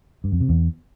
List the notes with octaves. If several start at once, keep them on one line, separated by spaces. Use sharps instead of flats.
G2
F2
C3
E2